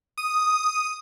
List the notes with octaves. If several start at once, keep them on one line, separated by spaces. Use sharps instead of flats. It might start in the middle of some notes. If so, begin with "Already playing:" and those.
D#6